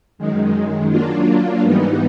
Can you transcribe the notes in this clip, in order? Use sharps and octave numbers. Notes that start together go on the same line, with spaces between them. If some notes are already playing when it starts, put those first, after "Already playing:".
F#2 D#3 G#3
F#3 A#3 D4 F4
G#2 E3 G3 B3 D#4